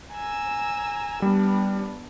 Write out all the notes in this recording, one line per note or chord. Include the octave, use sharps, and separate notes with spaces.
G#5 A#5 E6
G3 B3 D4